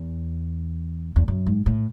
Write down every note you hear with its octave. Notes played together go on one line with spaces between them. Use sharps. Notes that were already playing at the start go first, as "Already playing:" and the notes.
Already playing: E2
E2
F#2
G#2
A2